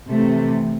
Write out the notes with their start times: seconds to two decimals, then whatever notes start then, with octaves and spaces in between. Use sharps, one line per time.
0.09 C3 E3 A3